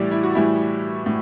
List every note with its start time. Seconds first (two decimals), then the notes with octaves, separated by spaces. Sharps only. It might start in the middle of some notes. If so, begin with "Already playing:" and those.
Already playing: A2 E3 G3 D5
0.11 E4
0.23 F#4
0.35 A2 E3 G3 E4
1.06 A2